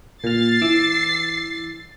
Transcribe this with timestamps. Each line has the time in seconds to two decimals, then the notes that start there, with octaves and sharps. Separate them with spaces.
0.24 A#2 F6 A6 C7
0.61 E3 D6 E6